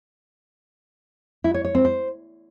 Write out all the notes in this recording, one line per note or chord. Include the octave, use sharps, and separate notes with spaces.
E4
C#5
C#5
C4
C5